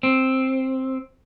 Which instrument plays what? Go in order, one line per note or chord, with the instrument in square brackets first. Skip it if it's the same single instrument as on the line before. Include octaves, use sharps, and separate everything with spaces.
[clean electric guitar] C4